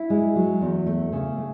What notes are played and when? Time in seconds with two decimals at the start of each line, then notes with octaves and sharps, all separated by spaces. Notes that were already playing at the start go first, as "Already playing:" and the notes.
Already playing: E4
0.10 G#3
0.36 F#3
0.61 E2
0.86 A3
1.13 C#3
1.38 A3